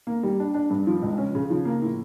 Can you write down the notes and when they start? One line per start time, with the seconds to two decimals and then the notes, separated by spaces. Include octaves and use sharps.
0.07 A#3
0.23 G3
0.40 D4
0.54 D4
0.70 G2
0.87 F3
1.02 C#2
1.18 C#4
1.35 C#3
1.50 F3
1.65 A#3
1.82 A2